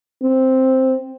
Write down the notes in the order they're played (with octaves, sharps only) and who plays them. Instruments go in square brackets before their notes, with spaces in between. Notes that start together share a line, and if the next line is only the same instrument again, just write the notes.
[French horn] C4